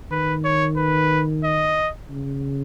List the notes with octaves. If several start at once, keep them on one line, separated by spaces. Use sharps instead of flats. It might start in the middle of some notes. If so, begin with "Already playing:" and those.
D#3 B4
C#5
B4
D#5
C#3